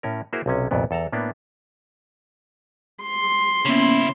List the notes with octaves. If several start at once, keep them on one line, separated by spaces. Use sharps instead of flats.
A2 C#4 A#4
A#3 E4 F#4 G#4 A#4 C5
B1 C3 C#4
C2 F2 A#2 B3
E2 A4 A5 A#5
A2 A#3 B3 D4
C6
C#3 A#3 B3 C#4 E4